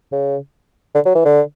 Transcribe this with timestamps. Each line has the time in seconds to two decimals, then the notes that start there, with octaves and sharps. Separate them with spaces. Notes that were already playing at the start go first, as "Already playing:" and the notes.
0.12 C#3
0.94 D3
1.05 F#3
1.15 E3
1.25 D3